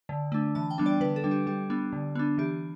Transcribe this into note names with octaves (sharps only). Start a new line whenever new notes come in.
D3
A3 D4
E3 A5
G5
G3 B3 D4
D5
D3 B4
A4
G3 D4
G4
G3 G4
B3 D4
D3
B3 D4
E3 G4